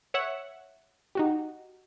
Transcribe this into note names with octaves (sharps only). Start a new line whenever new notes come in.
C#5 E5 F#5
D#4 F#4 G4